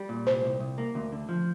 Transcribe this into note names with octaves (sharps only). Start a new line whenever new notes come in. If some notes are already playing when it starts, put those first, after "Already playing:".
Already playing: G3
A#2
C2 C5
C2
C2
A#3
D2
D3
F3